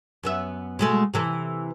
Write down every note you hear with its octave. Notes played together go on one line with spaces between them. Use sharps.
F#2 B3 E5
B2 G#3 A3
C3 E3 A4